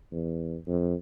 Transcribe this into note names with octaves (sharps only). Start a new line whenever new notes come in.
E2
F2